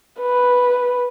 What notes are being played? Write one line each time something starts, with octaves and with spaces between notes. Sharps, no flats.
B4